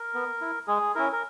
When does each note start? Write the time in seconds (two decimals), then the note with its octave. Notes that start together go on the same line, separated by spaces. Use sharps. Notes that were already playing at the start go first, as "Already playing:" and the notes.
Already playing: A#4
0.14 B3
0.41 E4
0.68 G#3 G#4
0.95 C#4 E4 A#4
1.12 A#4